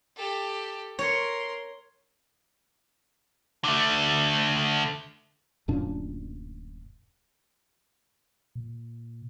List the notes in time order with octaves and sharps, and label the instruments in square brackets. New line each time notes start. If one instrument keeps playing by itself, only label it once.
[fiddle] G4 A4
[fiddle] A#4 C6 [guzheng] C#5
[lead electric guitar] D3 A3
[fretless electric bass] D1 F#2 A#2 D4
[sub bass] A#2